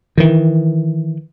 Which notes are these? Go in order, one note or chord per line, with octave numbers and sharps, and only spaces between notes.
D#3 E3